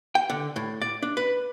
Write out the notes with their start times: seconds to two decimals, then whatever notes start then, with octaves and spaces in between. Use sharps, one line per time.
0.15 G5
0.30 D3
0.56 A2
0.82 D5
1.02 D4
1.17 B4